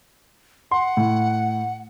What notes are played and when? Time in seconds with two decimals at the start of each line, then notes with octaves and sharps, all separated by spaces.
0.71 F#5 C6
0.97 A2